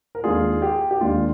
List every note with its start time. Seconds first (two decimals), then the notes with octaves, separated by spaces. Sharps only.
0.15 A#4
0.23 D#2 D#3 G#3 D4 F4 G#4
0.62 G4
0.91 G4
1.01 D#2 D#3 G#3 D4 F4